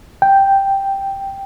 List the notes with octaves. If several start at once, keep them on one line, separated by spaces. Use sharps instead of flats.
G5